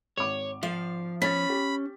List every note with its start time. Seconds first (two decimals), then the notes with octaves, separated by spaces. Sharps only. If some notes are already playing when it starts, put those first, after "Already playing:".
0.17 G#1 C#5 D6
0.63 F3 F5
1.22 C#4 B5 A6 B6
1.50 G4